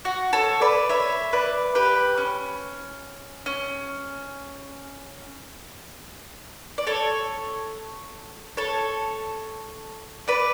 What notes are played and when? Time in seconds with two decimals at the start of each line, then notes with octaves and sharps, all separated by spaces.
0.05 F#4
0.33 A4 C#5
0.61 B4 D5
0.89 C#5 E5
1.33 B4 D5
1.75 G4 B4
2.18 C#4
3.46 C#4
6.78 D5
6.87 A4 C#5
8.57 A4 C#5
10.28 B4 D5